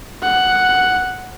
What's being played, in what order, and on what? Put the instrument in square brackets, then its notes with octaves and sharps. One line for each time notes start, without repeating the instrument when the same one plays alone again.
[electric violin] F#5